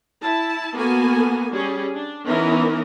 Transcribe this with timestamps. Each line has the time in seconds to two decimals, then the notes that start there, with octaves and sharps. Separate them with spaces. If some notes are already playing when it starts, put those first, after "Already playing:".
0.22 E4 A5
0.74 A#3 B3 F#4 A4 G#5
1.51 G3 C#4 G#4
1.93 D4
2.26 E3 B3 C#4 D#4 A#4